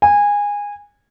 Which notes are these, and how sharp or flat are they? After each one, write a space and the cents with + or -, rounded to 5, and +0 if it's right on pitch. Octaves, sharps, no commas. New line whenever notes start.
G#5 -20